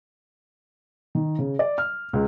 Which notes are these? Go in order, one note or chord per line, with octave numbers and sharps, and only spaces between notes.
D#3
C#3
D5
F6
C#2